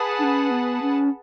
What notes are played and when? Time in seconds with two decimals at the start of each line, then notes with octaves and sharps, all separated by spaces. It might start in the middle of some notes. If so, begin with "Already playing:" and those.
Already playing: G#4 B4 F#5 A5
0.19 D4
0.23 C#4
0.51 B3
0.82 C#4